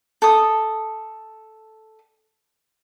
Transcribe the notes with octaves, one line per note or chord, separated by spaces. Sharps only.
A4 D#6